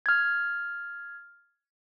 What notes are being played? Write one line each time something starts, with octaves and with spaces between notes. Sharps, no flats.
F6 G#6